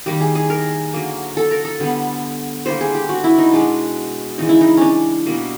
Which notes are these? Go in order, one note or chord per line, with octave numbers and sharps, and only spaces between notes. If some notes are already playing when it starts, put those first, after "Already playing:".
D#3 G3 A#3 G4
G#4
G#4
A#4
D3 F#3 A#3
A4
A#4
A4
D3 G3 B3
D3 G3 A#3 C5
G#4
G4
F#4
E4
D#4
B2 G#3 B3 D4
C#3 E3 G#3 D#4
E4
D#4
C#4 D4
B2 G3 A#3